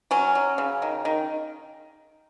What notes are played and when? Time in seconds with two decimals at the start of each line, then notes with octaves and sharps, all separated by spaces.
0.11 F#3 C#4
0.35 F#3
0.58 C#3
0.82 D#3
1.05 D#3